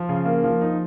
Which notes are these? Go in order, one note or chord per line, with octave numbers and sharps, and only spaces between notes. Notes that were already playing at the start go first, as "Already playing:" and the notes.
Already playing: F3
C#3
A#3
F3
D#4